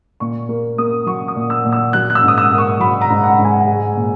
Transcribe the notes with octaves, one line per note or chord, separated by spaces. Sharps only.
A#2 C#6
A#3
A#3 D#6
F#3 C#6
D#6
A#2
E6
A#2
E6
F#3 F#6
F#6
E6
G#2
D#6
E6
A#3
C#6
F#3 B5
A#5
G#2
F#5
G#2
G#5
G#3
A#2